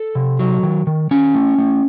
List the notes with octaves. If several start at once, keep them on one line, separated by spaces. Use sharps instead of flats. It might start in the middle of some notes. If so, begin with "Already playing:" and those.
Already playing: A4
C3
F#3
D#3
D#3
D#3 C#4
A3
A3